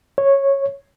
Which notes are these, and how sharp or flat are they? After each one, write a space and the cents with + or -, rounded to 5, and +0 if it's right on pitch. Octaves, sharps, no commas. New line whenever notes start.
C#5 -10